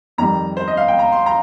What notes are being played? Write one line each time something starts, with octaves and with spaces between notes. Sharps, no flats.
F2 D#3 G3 A#5
C5
D#5
F5
G5
A#5
C6
A#5